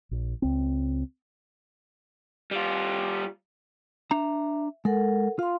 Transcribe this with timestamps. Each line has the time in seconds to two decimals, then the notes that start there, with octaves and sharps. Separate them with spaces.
0.11 A#1
0.42 C#2 C4
2.51 G3 F4
4.11 D4 E5 A#5
4.85 G#3 A4 A#4 F#5
5.39 F4 F5 C6